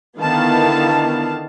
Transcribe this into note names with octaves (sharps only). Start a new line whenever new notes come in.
D3 D#3 B3 E4 F5 A5